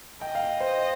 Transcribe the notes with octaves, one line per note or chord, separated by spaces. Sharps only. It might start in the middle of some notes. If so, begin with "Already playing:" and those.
D#5 G5
F5
C5